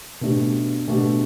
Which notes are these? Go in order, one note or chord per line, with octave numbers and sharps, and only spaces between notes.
B2 A3 D4 G4
B2 A3 D4 G4